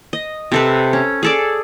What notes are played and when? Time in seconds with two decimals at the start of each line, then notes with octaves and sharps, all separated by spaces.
0.13 D#5
0.52 C3 A4 B4
0.93 C#4
1.23 G#4 A4 D5